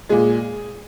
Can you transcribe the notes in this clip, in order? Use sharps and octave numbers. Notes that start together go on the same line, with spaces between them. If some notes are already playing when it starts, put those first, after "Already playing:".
A#2 G#3 G#4